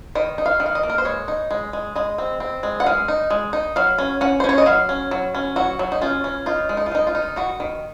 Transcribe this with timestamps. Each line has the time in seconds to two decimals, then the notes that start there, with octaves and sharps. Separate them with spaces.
0.15 D#3 D#5
0.38 D#4
0.46 F5
0.60 D#3
0.66 F5
0.75 D#5
0.83 A#3
0.90 A#4
0.98 C5
1.05 G#3 C#5
1.28 D#4
1.51 G#3
1.73 G#3
1.95 G#3 D#5
2.18 C4
2.40 C4
2.63 G#3
2.80 F#5
2.86 G#3 F5
3.08 D#4
3.30 G#3
3.53 D#4
3.76 F#3 F5
3.98 C#4
4.21 C#4 F#5
4.40 C5
4.44 C#4
4.49 C#5
4.58 D#5
4.66 F#3 F5
4.89 C#4
5.11 F#3
5.35 C#4
5.56 F#3 F#4
5.79 F#3
5.92 D#4
6.01 C#4 F4
6.24 C#4
6.46 D#4 F4
6.69 G#3
6.77 D#4
6.86 F4
6.92 G#3 D#4
7.07 F4
7.15 D#4
7.36 D#3 F#4
7.60 D#3